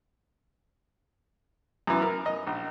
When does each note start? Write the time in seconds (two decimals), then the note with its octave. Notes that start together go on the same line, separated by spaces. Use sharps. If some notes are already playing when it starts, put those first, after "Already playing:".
1.87 F#2 E3
2.02 A#4
2.26 D#5
2.47 A#1